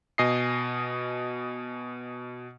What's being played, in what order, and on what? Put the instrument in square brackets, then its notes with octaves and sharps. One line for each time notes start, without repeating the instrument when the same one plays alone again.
[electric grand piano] B2 D#5 G#5 D#6 C7